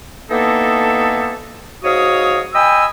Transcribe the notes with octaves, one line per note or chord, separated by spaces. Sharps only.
E3 A#3 B3 D#4 A4
G#2 F#4 C#5 F5 D#6
D#5 G5 G#5 B5 D#6 E6